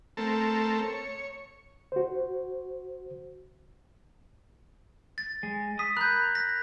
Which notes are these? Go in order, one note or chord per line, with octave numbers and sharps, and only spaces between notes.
A3 C4 A4 A#4
C#5
F#4 C5
A6
G#3
D#6 B6
A#4 A#5 B5 F#6 G6
A#6